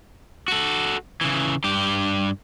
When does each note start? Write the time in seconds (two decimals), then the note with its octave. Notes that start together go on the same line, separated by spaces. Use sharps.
0.48 F#4 A4
1.21 C#3 E3
1.64 G2 G4